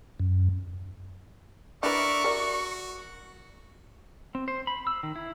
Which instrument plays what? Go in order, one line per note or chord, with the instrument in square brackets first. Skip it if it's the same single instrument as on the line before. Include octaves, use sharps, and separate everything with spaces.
[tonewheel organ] F#2
[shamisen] D4 E4 B4 [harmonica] A#4 D5 E5 [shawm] C#6
[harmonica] F#4 [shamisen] A#4 D5
[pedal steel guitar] C4
C5
B5
E6
D#3
E4